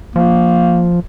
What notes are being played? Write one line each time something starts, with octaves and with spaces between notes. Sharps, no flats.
F3 A#3